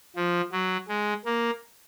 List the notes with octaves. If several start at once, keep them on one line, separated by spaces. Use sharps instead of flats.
F3
F#3
G#3
A#3